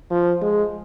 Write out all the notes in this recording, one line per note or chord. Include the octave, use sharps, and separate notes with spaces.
F3
G#3